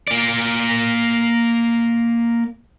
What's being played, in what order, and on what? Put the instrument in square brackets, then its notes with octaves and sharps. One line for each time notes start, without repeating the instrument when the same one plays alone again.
[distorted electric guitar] A#3 D5